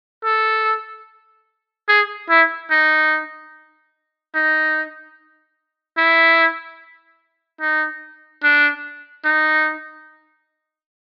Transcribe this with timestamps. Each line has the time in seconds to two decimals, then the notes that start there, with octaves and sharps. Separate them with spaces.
0.25 A4
1.89 G#4
2.29 E4
2.71 D#4
4.34 D#4
5.97 E4
7.61 D#4
8.43 D4
9.25 D#4